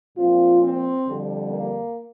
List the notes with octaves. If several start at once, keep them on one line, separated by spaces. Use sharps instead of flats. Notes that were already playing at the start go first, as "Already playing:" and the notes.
A#2 F3 C4 F4
C4
F2 D3 G3
A#3